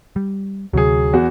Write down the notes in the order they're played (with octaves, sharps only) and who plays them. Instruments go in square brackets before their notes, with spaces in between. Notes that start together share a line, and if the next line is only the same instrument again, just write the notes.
[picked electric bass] G3
[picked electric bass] D2 C3 [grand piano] F#3 G#4
[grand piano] E2 F#4